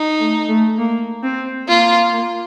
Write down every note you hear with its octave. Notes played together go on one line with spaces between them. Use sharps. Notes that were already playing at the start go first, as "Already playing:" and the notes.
Already playing: D#4
A3
A3
A#3
C4
A#3 F4